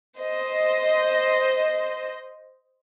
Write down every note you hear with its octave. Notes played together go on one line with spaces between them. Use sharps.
C5 D#5